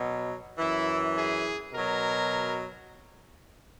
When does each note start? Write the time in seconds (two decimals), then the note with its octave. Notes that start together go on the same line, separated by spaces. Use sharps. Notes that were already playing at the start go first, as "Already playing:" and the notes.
Already playing: B2 F#3
0.58 F#2 E3 E4
1.16 G#4
1.74 B2 F#3 A#4